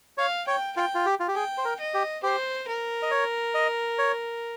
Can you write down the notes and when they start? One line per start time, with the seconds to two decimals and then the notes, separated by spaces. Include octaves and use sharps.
0.18 C#5 F5
0.47 C#5 G5
0.76 F4 G5
0.95 F4
1.06 G4
1.20 F4
1.28 G4
1.35 G#4 G5
1.58 C5
1.65 A#4
1.80 D#5
1.94 G4
2.23 G4 C5
2.68 A#4
3.02 D#5
3.11 C#5
3.54 D#5
3.99 C#5